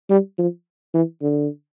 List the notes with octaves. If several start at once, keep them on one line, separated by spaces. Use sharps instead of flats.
G3
F3
E3
D3